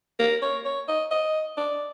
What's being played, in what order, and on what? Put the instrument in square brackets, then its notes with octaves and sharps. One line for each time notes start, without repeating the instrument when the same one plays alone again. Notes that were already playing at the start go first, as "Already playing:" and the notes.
[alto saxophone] A#4
C#5
C#5
D#5
D#5
D5